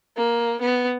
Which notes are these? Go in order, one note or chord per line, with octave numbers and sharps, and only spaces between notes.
A#3
B3